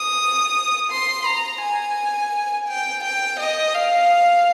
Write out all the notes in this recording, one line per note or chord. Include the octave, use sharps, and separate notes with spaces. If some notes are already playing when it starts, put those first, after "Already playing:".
Already playing: D#6
C6
A#5
G#5
G5
G5
D#5
F5